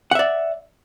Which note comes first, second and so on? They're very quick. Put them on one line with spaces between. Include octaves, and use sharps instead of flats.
F#5 E5 D5